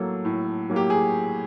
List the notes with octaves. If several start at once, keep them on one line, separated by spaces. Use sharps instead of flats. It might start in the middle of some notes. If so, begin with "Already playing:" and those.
Already playing: A2 F#3 A#3 A4
A2
F#3 A#3
G4
G#4